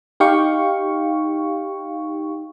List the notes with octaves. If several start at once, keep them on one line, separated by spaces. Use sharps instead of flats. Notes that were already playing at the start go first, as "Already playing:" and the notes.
D#4 G4 F5 G5 C#6